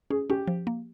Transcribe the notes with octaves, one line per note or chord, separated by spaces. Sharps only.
C#4 G#4
C#4 G4
F3
A#3